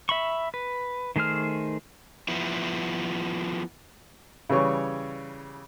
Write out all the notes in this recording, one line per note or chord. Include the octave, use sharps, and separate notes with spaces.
E5 B5 C#6
B4
D#3 A3 G#4 C5 F6
F3 B3 E4
C#3 E3 G3 C#5 C#6